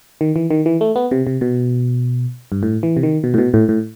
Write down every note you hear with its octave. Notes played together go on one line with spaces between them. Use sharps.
D#3
E3
D#3
E3
A3
B3
C3
C3
B2
G2
A2
E3
C3
D#3
B2
A2
B2
A2
A2